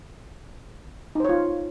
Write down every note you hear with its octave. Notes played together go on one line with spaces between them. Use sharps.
D#4 F4 C5 C#5